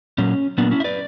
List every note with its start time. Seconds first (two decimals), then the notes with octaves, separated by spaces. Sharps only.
0.18 A#2 F#3 A#3 C#4
0.58 A#2 F#3 A#3 B3 D4
0.71 C#4 E4
0.80 E5
0.84 B4 D5